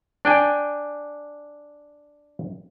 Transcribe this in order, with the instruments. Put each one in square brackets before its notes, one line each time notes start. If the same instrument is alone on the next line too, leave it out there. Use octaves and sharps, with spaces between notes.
[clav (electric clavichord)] D4 G5 G#5